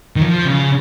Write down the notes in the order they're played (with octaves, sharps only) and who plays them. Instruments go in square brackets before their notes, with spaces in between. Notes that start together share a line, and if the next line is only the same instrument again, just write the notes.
[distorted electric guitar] D#3
F3
C#3